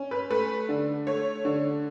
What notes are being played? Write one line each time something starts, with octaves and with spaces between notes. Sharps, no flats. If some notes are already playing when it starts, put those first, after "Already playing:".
Already playing: C#4
B4
A3 B4
D3
A3 C#5
D3